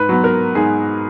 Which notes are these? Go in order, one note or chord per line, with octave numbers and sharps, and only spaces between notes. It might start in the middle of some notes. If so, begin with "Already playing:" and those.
Already playing: G#2 B4
F#3 B3
A#4
G#2 G#4